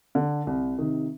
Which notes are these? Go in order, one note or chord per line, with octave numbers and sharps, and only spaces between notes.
D3
C2
C3 D#3